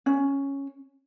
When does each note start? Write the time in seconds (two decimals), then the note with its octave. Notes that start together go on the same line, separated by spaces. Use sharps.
0.06 C#4